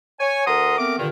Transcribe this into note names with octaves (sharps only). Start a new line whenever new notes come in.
C#5 G#5
D2 A#4 F#5 A#5 C6 D#6
A3 B3 C4 A#4 D6
G2 A#2 D3 D#3